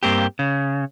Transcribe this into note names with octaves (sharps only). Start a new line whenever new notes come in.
G2 A#3 C4 G4
C#3